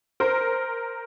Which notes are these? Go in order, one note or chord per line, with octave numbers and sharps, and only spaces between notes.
A#4 C5